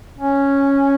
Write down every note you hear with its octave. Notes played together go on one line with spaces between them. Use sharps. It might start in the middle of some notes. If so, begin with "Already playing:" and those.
C#4